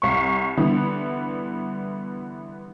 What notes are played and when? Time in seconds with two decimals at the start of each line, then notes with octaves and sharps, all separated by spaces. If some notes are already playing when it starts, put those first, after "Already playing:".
0.02 C2 C#6
0.57 D3 E3 G3 B3